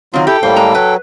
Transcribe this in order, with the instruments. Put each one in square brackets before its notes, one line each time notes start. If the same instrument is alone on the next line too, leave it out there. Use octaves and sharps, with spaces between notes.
[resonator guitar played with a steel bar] D#3 C4 [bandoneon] F#3 F4
[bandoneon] E4 [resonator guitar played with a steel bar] G4 [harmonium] A4 G5
[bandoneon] A2 G3 A#3 [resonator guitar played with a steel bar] C5
[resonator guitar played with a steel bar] G#3 A#5
[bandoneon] F#3 [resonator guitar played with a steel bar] B4